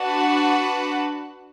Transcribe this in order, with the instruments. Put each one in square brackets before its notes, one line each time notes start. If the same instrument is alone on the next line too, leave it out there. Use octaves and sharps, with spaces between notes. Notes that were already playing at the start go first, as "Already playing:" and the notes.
Already playing: [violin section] D4 F#4 B4 F#5 A5